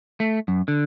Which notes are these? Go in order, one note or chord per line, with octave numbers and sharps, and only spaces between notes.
A3
F#2
D3